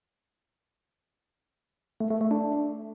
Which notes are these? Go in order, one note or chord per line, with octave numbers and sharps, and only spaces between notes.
A3
A3
A3
D4